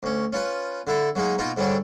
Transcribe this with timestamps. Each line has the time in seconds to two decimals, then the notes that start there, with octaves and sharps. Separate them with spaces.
0.03 D2 C#4
0.33 C#4 F4 B4
0.87 D3 E4 A4
1.15 F#3 G#3 A#3 D#4
1.38 B2 A#3 D#4 F4
1.57 G#2 D3 G3 C#4 D4